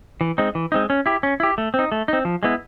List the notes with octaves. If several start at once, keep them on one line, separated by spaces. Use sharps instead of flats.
E3
G#3 C4 D#4
E3
G#3 C4 D#4
C#4
E4 G4
C#4
E4 G4
A3
C4
D#4
A3
C4 D#4
F3
G#3 B3 E4